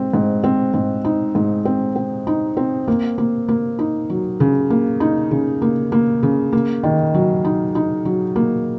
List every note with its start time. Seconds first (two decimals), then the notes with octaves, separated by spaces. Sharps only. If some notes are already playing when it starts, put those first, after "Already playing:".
Already playing: G#2 C4
0.14 G#2
0.44 C4
0.74 G#2
1.05 D#4
1.35 G#2
1.65 C4
1.96 C4
2.27 D#4
2.57 C4
2.88 A#3
3.18 A#3
3.49 A#3
3.79 D#4
4.10 F#3
4.40 C#3
4.70 A#3
5.00 D#4
5.31 C#3
5.62 A#3
5.92 A#3
6.23 C#3
6.53 A#3
6.84 D#3
7.14 F#3
7.45 D#4
7.75 D#4
8.05 F#3
8.36 A#3